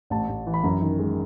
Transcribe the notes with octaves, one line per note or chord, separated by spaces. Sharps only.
A1 A5
A1
E3
B5
F#2 A#5
D#3
G#3